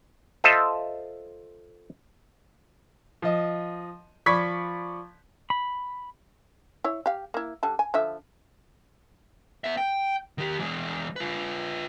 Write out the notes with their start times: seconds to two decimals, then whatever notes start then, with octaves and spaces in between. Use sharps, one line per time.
0.44 F4 A4 C5 D#5 E5
3.22 F3 D#5
4.26 F3 D5 B5 C#6 G#6 B6
5.50 B5
6.84 E4 C#5
7.06 G4 F5
7.34 A#3 E4
7.63 D3 G3 A5
7.79 G#5
7.94 D3 F3 E5
9.64 B3 E5
9.77 G5
10.38 D#3 G4
10.59 E3 G#3
11.16 F4 B4